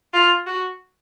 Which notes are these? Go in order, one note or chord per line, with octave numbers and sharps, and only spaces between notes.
F4
F#4